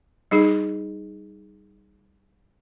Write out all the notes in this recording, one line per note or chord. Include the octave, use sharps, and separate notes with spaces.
G3 D#4 G#4